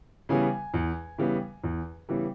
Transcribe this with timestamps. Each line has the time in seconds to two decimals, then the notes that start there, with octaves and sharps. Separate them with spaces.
0.29 C#3 E3 G3 B3 G#5
0.74 E2
1.18 C#3 E3 G3 B3
1.64 E2
2.09 C#3 E3 G3 B3